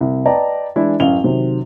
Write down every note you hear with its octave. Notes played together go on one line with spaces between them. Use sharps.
C2
B4 D5 D#5 G5 A5 A#5
E3 G#3 D4 E4
A1 F#2 F5 F7 G7
C3 D#3 F#3